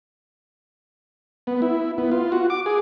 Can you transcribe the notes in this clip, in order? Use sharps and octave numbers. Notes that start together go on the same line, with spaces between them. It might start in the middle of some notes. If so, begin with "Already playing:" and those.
B3
E4
B3
F4
F#4
D6
G#4